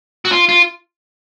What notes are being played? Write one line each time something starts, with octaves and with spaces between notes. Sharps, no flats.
F#4
F4
F4